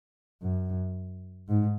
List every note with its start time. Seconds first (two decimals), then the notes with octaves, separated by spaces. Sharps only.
0.42 F#2
1.48 G#2